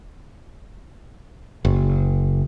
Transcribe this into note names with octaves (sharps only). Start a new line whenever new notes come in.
F#1